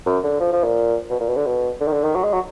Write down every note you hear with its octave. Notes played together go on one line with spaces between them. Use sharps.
F#2
D3
F3
F3
A#2
B2
A#2
B2
D3
B2
D3
D#3
D3
D#3
F#3
G#3
F#3